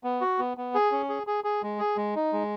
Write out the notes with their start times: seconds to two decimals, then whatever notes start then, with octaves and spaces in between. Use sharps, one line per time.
0.04 B3
0.21 F#4
0.39 B3
0.57 B3
0.74 G#4
0.92 C#4
1.09 G#4
1.27 G#4
1.44 G#4
1.63 G#3
1.79 G#4
1.97 G#3
2.15 D#4
2.33 G#3